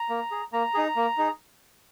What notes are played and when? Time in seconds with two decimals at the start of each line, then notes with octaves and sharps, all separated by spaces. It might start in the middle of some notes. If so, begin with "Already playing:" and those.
Already playing: A#5
0.10 A#3
0.32 G#4
0.53 A#3 A#5
0.74 D#4 G#4
0.96 A#3
1.18 D#4 G#4